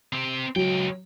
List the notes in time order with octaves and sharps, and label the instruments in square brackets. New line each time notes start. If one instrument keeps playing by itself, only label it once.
[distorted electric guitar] C4 G4
[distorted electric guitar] C#2 G5 [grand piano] F#3